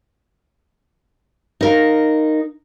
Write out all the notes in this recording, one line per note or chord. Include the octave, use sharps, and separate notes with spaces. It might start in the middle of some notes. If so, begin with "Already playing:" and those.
D#4 A#4 F5